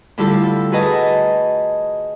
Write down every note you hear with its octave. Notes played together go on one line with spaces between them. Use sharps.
A2 D3 G3 E4 F4 A4
F#4 G#4 B4 D#5 A5 A#5